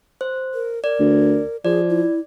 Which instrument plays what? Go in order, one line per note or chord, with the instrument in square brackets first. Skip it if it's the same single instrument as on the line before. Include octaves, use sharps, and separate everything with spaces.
[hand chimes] C5
[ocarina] A#4
[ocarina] A#4 [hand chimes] D5
[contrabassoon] D2
[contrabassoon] F3 [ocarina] G#4 [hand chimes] D5
[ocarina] E4